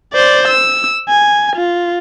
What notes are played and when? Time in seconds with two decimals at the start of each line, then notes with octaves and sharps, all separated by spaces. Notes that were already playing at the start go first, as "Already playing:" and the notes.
0.13 C5 D5
0.48 E6
1.09 G#5
1.56 F4